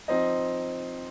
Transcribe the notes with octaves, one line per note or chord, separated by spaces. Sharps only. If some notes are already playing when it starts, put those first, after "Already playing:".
F3 C4 D#4 D#5